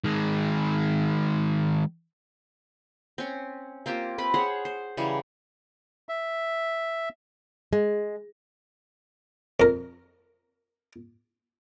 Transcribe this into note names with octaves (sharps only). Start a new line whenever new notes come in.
D#3 G#3
C4 C#4
A#3 C4 F4 G4
C4 B4 B5
G#4 C5 C#5 F#5
C5
C#3 E3 F#3 G3
E5
G#3
F2 A#4